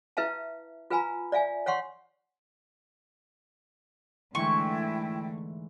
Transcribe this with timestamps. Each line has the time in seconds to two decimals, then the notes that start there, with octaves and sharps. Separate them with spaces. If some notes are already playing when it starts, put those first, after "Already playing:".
0.17 E4 B4 E5 F5 A5
0.90 F4 B4 F5 G#5 A#5 B5
1.32 D5 E5 F5 G#5
1.66 C#5 F5 F#5 C6 C#6
4.35 G#2 D3 E3 A3 E4 G5 C6 C#6